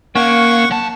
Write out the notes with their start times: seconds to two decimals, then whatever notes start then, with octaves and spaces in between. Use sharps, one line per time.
0.16 A#3 C#4 F5 F#5 C#6
0.71 F#3 A5